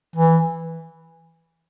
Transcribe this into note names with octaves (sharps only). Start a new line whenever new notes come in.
E3